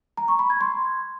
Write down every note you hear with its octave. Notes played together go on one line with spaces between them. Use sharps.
A#5
C#6
B5
G#6
C6